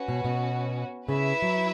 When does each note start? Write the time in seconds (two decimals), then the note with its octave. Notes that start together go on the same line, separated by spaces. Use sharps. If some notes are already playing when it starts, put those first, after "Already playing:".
Already playing: C#4 F#4 B4
0.08 B2
0.25 B2
1.08 C#3 E4 B4 E5
1.42 F#3